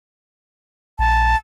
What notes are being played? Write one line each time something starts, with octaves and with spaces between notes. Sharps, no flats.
A#1 A5